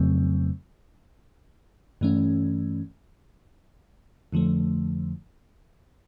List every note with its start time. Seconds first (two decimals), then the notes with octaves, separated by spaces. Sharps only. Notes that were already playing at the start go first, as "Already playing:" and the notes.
Already playing: F2 C#3 F#3 A3 C4
2.01 G2 E3 A3 C#4
4.33 F2 D3 F3 A3